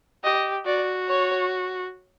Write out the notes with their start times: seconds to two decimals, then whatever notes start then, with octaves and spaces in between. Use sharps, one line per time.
0.24 G4 D#5
0.66 F#4 D5
1.08 C#5